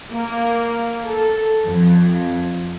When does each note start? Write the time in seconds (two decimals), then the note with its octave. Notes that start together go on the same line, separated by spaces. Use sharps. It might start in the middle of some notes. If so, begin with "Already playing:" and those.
0.11 A#3
1.05 A4
1.68 F2